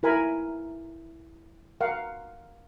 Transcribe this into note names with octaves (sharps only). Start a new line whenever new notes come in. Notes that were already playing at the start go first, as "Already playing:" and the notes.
E4 A#4 G#5 B5
A#4 F5 F#5